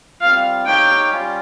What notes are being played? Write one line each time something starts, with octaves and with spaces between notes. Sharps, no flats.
G3 C4 F4 F5
D#4 G4 C#5 F5 G5
G3 C#4 F4